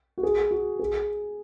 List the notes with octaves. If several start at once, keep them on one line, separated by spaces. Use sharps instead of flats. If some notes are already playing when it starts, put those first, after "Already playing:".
F#4
G#4
F#4
G#4